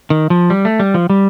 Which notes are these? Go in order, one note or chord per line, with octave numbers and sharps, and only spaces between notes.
D#3
F3
G3
A3
G3
F3
G3